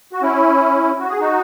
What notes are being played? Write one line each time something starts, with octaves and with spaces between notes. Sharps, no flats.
F#4
C#4 E4
F#4
G#4
D#4 F#4